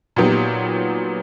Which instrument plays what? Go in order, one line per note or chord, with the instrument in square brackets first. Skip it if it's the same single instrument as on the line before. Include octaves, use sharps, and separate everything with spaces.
[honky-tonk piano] A#2 F#3 B3 D#4 G4